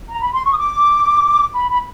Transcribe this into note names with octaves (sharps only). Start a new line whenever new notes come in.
A#5
B5
C6
C#6
D#6
D6
B5
B5